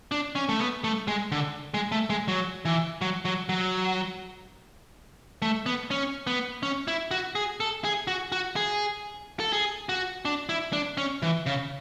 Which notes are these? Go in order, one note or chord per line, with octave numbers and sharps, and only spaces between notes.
D4
C#4
A3
B3
A3
G#3
D3
G#3
A3
G#3
F#3
E3
F#3
F#3
F#3
A3
B3
C#4
B3
C#4
E4
F#4
G#4
A4
G#4
F#4
F#4
G#4
A4
G#4
F#4
D4
E4
D4
C#4
E3
C#3